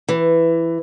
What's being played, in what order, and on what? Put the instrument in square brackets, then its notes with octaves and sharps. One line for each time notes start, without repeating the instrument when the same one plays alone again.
[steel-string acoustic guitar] E3